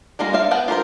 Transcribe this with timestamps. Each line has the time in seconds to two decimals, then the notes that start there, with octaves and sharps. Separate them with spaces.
0.19 G3 G#3 A#3 F4 F#4
0.33 A3 D4 E5 F5
0.51 B3 B4 F#5 G5 A5
0.68 F4 G4 A#4 C5